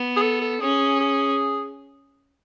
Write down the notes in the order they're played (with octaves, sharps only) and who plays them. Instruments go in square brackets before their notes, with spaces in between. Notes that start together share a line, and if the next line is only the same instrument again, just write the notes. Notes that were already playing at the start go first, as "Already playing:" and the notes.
Already playing: [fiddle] B3
[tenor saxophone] G#4
A4
A4
[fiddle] C#4 [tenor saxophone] G#4
[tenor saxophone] G#4